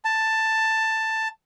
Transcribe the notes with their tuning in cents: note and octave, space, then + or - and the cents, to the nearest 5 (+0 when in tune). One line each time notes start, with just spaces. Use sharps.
A5 +10